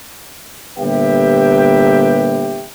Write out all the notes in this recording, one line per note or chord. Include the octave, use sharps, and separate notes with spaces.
G1 A#2 G4 B4 E5 G5